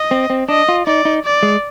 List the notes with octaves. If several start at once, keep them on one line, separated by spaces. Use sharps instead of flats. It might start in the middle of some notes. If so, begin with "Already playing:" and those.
Already playing: D#5
C4
C4
D4 D#5
F4
D#4 D5
D#4
D5
G#3